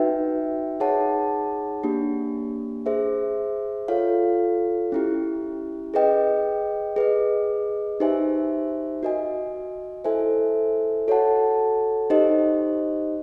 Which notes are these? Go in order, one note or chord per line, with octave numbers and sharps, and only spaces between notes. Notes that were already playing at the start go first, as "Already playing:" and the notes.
Already playing: D#4 F#4 B4 E5 G5
D#4 G#4 C#5 F#5 A5
A#3 D4 G4
G#4 C5 E5
F4 A4 C#5 F5
C#4 E4 G4
G#4 B4 D#5 G5
G#4 B4 D#5
D#4 G4 C5 E5 G#5
F#4 A#4 D#5 G#5
E4 A4 C5 E5 G#5
F#4 A4 C#5 F#5 A5
D#4 G4 C5 D#5